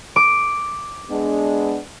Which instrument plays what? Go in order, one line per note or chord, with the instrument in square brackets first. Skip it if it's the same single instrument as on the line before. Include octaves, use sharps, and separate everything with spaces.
[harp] D6
[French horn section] G#3 B3 D4